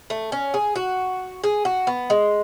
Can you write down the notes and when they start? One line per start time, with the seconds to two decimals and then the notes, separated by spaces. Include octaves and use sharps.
0.10 A3
0.32 C#4
0.54 G#4
0.76 F#4
1.43 G#4
1.65 F#4
1.87 B3
2.10 G#3